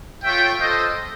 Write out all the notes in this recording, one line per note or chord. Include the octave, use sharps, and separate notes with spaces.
F4 A4 C#5 E5 G5
F4 A4 C5 D#5